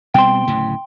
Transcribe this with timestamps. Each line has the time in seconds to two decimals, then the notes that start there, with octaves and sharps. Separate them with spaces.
0.14 B2 G3 C4 G5 C6
0.47 D1 A2 C#3